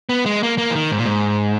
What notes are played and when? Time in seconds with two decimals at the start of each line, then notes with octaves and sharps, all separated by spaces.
0.09 B3
0.26 G#3
0.43 A#3
0.58 A#3
0.70 E3
0.75 D#3
0.92 G#2
0.98 A#2
1.06 G#2